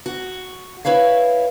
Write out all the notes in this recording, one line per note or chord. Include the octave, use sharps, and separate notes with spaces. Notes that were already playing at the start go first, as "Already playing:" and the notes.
F#4
E4 B4 C#5 F5